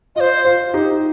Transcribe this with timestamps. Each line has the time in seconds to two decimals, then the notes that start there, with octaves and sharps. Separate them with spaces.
0.16 F4 D#5
0.20 C5
0.45 F4
0.74 D#4 G4